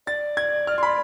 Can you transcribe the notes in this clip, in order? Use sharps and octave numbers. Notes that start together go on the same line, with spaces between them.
D5 A6
G#6
F6
C6
B5